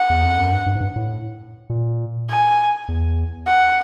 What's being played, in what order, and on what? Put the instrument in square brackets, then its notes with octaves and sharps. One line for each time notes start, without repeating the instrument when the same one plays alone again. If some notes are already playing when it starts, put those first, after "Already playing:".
Already playing: [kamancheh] F#5
[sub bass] E2
F2
F#2
G2
G2
G#2
G2
A2
A#2
[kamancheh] G#5
[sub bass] E2
[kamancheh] F#5